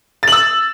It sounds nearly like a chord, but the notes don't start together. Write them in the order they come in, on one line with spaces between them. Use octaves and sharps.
A6 F#7 E6